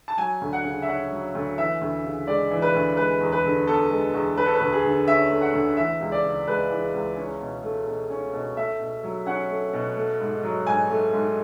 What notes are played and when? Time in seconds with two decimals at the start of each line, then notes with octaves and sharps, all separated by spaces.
0.08 A5
0.17 F#3 G#5
0.41 D2
0.53 F#5
0.64 C#3
0.82 E5
0.88 C#4 F#5
1.12 F#3
1.35 D2
1.58 E3 E5
1.81 D2
2.04 C#3
2.27 G#3 D5
2.51 E3
2.62 B4
2.75 D2
2.97 G#3 B4
3.21 E2
3.32 B4
3.44 D3
3.67 B3 A4
3.90 G#3
4.14 E2
4.37 A3 B4
4.46 A4
4.55 B4
4.61 D2
4.73 G#4
4.84 D3
5.07 C#4 E5
5.31 A3
5.42 F#5
5.53 D2
5.77 E3 E5
6.01 C#2
6.12 D5
6.23 C#3
6.47 G#3 B4
6.70 E3
6.93 C#2
7.17 C#4
7.40 B2
7.63 A3
7.87 B2
8.10 C#4
8.33 B2
8.57 A3 E5
8.80 B2
9.04 F#3
9.26 C#4 F#5
9.50 A3
9.73 B2
9.97 A3
10.20 G#2
10.43 F#3
10.66 G#2 G#5
10.90 A3
11.13 G#2